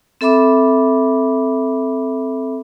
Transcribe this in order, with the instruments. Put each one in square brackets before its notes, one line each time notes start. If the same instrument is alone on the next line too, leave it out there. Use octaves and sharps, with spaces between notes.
[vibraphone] C4 A4 E5 B5 D6